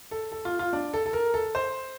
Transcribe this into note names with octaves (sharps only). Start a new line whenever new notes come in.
A4
A4
F4
F4
D4
A4
A4
A#4
A4
C5